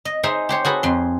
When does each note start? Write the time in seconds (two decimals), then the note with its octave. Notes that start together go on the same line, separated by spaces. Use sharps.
0.05 D#5
0.23 D#4 G#4 C5 E5
0.49 G4 C5 C#5
0.65 F#4 G#4 A4 B4
0.83 F2 C6